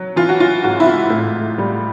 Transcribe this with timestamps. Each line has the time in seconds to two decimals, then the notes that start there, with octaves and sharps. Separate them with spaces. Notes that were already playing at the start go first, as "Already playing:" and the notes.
Already playing: F#3
0.16 E3 F4
0.29 F#4
0.40 F4
0.63 G#2 F#4
0.80 E4
0.87 F4
1.10 A2
1.58 G3